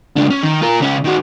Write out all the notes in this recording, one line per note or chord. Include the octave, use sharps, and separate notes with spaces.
C#2 D4
C#4
D#3
F4 A#4
C#2 C#4
D#3 F#4